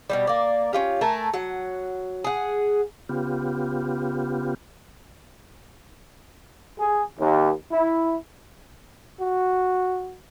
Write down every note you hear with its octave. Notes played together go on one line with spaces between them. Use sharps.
B2 E3 G3
A#3 D5
C#4 F4 G4
A3 A#4 G#5 A5
F#3 F#5
G#4 F#5
C#3 B3 F4 G4
G#4
D#2
E4
F#4